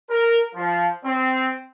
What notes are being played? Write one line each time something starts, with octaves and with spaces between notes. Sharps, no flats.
A#4
F3
C4